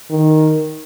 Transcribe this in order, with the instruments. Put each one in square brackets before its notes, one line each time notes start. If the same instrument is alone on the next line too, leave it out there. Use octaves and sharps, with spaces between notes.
[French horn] D#3